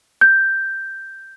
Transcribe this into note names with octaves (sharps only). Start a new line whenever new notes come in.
G6